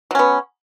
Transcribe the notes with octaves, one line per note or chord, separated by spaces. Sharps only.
F#3 B3 C#4